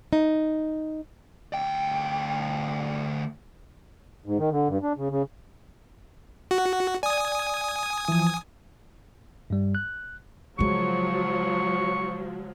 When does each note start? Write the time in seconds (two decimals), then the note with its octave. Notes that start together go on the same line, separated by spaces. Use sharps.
0.13 D#4
1.54 D2 G5
4.26 G#2
4.39 D#3
4.51 D3
4.68 G2
4.83 D4
4.97 C#3
5.11 C#3
6.51 F#4 F#5
7.03 D5 G#5 D#6
8.08 E3 F3
9.50 G2 G3
9.75 F#6
10.59 C#3 F3 F#3 G#3 C#6